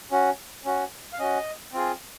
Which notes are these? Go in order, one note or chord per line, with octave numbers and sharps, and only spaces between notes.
C#4 F#4
C#4 F#4
F5
C#4 F#4 D#5
C4 F4 G#4